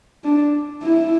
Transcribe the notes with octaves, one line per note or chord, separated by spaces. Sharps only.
D4
E4